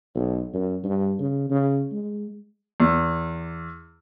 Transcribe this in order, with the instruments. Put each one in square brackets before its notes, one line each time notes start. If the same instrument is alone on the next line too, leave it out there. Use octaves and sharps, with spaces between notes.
[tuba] B1
F#2
G2
C#3
C#3
G#3
[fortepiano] E2